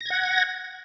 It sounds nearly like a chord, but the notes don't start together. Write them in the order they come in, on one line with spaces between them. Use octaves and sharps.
A#6 G#6 F#5